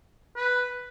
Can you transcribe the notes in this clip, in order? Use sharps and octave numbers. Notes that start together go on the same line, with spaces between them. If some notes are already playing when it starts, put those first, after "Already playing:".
B4